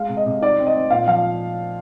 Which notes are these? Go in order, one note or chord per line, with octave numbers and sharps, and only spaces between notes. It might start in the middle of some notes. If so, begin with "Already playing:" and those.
Already playing: G#3 F5
C3
D#5
C3
D#4 D5
C4
D#5
C4
A#2 F5
F3 F5